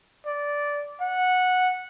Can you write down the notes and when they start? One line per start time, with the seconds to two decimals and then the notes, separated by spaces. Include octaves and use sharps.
0.26 D5
1.01 F#5